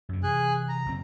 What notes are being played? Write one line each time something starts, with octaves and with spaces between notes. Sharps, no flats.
F#2 D3
C3 E3 G#4 G#5 F#6
A#5
F#1 C3 C4